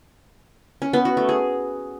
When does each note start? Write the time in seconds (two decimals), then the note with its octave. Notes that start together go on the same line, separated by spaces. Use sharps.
0.82 C#4
0.93 B3
1.05 F#4
1.17 A3
1.29 G#4